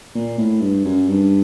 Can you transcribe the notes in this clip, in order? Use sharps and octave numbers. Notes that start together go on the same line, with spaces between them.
A#2
A2
G2
F#2
G2